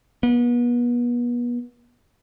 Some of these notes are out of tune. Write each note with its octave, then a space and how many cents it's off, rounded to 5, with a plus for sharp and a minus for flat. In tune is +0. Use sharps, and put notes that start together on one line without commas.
B3 -35